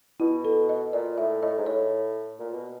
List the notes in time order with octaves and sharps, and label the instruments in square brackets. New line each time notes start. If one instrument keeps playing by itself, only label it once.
[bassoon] B2 [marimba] E4
[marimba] A4
D#5
[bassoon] A#2 [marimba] D5
[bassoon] A2 [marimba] E5
[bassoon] A2 [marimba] D#5
[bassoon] G#2
[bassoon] A2 [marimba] C#5
[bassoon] A#2
B2